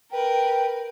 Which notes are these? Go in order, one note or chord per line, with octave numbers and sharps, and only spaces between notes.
A#4 B4 G5